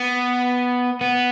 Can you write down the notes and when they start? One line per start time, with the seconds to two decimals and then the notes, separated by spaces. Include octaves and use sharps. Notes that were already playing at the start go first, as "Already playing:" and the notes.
Already playing: B3
1.01 B3